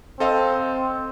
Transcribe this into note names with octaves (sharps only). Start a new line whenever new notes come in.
C4 A4 D#5 F5